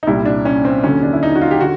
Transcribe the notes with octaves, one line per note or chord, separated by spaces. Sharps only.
D#4
C2 A#2 G3 E4
D4
C#4
C4
D#2 D3 F#3 C#4
D4
E4
D#4
F#4
F4
G4
D3 F#4